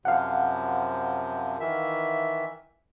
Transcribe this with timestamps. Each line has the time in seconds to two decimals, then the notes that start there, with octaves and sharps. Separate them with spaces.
0.05 F#2 C3 F3 F5 F#5
1.60 D#3 E3 E5